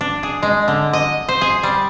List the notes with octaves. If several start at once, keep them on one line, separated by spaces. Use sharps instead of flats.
D4
G#4
G#3
D3
D#5
C5
G#4
G3